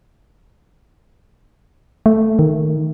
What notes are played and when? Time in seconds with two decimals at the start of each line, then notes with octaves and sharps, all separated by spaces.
2.06 A3
2.39 D#3